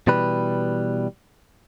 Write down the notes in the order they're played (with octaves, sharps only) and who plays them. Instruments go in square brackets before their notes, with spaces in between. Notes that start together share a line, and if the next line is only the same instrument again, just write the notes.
[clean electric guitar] B2 E3 G3 B4